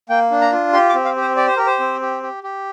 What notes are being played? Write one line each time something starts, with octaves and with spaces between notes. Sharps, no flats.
A#3 G5
D4
A#5
F4
G4 C6
D6
C4
F5
G4
C5
G4 D5
C5
G4 A#4
C5
C4
G4
G4
G4